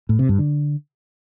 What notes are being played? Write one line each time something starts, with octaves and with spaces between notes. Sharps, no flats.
A2
C3
G2
D3